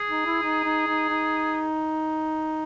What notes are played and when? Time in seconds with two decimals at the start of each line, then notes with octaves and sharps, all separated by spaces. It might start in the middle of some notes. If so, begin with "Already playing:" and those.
Already playing: G#4
0.10 D#4
0.26 E4
0.43 D#4
0.65 D#4
0.88 D#4
1.09 D#4